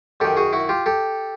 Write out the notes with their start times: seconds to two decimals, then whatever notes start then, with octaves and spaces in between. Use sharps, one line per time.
0.20 F#2 D#3 G4 A4
0.37 F#4 G#4
0.53 E4 F#4
0.69 F4 G4
0.86 G4 A4